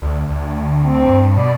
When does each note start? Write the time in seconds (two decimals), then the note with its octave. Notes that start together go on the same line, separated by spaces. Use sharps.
0.02 D2
0.28 D2
0.83 C4
1.06 G2
1.36 B2 D5